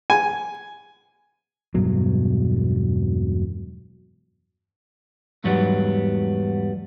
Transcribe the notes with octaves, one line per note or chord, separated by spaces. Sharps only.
G#5
E1 G2 B2 F#3
E2 G#2 F#3 G3 B3